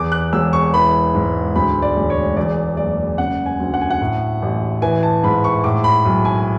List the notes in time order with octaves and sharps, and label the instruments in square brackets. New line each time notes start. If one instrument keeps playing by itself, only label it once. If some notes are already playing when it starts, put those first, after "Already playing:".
Already playing: [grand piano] E2 D6
F#6
E1 E6
C#6
E3 B5
G#2
D2 B5
D5
E1
C#5
E2 D5
F#1 D5
C#3 F#5
G#5
D2
F#5
G#5
F#5
A2
A1
E3 G#5
A5
G#2 B5
C#6
A2 D6
B5
B1
G#5